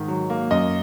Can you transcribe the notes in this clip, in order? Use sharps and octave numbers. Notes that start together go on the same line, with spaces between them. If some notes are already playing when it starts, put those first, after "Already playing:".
Already playing: G#2 D#3
F#3
A#3
F#2 D#5